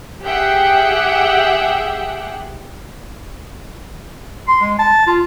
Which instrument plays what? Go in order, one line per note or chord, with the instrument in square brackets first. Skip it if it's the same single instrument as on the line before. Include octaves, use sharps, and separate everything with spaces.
[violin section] G4 G#4 E5 F#5 G5
[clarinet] C6
G#3
A5
F4